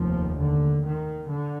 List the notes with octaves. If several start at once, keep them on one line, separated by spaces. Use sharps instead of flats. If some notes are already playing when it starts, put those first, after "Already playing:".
Already playing: F1 D#2 F3
D3
D#3
D3